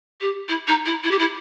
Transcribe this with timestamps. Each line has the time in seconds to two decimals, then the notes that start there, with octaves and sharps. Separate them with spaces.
0.21 G4
0.49 E4
0.68 D#4
0.86 E4
1.04 E4
1.11 G4
1.19 E4